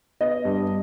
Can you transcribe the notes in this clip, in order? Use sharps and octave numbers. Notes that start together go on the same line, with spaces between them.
B3 D#5
G2